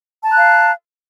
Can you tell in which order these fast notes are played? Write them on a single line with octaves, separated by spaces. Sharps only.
A5 A#5 F#6 F5